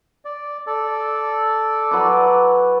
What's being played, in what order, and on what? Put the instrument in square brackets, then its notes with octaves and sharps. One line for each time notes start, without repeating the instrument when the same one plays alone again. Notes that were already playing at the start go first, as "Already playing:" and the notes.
[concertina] D5
A4 D5
[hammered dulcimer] F#3 B4 D6